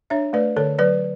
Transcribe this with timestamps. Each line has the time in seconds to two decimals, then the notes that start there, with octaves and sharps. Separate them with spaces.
0.10 D4 C#5 E5
0.33 A3 B4 D5
0.57 D3 A4 C#5
0.79 F#3 B4 D5